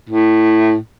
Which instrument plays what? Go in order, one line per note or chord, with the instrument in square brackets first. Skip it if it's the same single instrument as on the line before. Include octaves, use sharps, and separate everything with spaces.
[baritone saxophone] A2